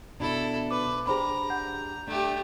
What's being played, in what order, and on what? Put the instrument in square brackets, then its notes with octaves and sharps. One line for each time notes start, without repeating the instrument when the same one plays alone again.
[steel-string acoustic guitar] B2 D4 [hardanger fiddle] E4 A4
[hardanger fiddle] B4 [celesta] D6
[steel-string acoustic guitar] D4 G4 [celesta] G#4 C5 B5 [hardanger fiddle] A#5
[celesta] F#5 G6
[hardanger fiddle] A3 G4 [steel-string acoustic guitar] D4